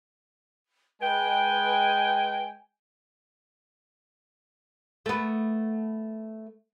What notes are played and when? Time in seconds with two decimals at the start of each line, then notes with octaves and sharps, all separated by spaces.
1.01 G#3 B4 G5 G#5
5.06 A3 B3